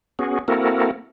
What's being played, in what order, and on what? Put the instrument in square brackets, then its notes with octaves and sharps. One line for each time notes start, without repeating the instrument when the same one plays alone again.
[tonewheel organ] B3 C#4 F#4 G#4
A#3 C4 E4 F#4 A4 A#4